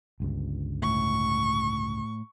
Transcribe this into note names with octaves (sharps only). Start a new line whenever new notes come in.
G1 C#2 G2
A2 C#6